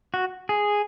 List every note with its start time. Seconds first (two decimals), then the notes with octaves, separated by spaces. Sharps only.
0.14 F#4
0.49 G#4